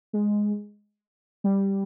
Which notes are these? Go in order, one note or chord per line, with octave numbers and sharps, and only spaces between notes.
G#3
G3